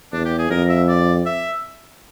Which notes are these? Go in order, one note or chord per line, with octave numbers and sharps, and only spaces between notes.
E2 D4
G4
G#4
F2 A#4
E5
D5
E5